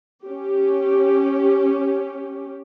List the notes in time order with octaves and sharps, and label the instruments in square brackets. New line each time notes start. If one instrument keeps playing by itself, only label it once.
[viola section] C#4 G4